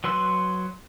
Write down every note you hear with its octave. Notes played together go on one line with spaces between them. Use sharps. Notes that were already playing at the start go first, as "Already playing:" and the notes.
F#3 B4 C6 E6 F#6